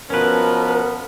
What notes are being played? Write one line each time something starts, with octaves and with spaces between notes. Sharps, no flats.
B2 F3 B3 C#4 A#4 B4